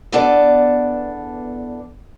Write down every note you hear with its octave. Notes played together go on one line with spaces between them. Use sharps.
E2 B3 D4 A4 D5